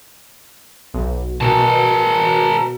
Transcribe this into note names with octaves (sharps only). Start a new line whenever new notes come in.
B1
B2 A#4 A5